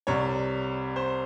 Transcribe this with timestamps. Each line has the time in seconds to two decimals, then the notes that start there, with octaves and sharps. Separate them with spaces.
0.07 C2 C3 G3 C#5
0.96 C5